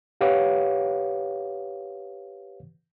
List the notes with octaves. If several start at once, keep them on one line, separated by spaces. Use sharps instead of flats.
G4 B4 C#5 F5 F#5 D6